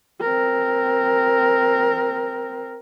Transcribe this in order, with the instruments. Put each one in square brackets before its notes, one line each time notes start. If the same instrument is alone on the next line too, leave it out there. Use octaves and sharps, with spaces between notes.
[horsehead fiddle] C4 A#4